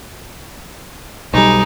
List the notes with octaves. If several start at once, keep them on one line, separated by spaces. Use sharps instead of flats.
B1 G3 G#3 D#4